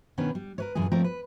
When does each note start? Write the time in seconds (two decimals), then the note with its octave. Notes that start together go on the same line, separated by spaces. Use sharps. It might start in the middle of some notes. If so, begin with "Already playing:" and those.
0.18 B2 D#3 B3 C#4 D4 B4
0.35 G3
0.58 A#4 B4 C#5
0.75 F#2 A#2 D3 E3 G#4
0.92 F3 A3 C4 G4 A#4
1.04 B4